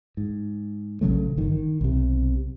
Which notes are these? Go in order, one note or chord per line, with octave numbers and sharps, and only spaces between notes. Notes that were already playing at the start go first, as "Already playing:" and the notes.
G#2
A#1 C#3 F#3 A3
G1 D#3
D#3
B1 C3